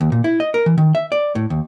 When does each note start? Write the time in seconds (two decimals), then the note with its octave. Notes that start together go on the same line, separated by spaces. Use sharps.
0.01 D#2
0.12 A#2
0.24 E4
0.40 D#5
0.54 A#4
0.66 E3
0.78 D#3
0.95 E5
1.12 D5
1.35 A2
1.50 D#2